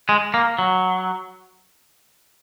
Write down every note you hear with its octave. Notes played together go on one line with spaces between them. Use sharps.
G#3
A#3
F#3